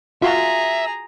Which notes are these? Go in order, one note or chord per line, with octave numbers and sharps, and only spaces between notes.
F4 F#4 G#4 E5 A#5 C6